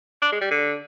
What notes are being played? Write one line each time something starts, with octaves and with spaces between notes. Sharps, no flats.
D4
G#3
G3
D3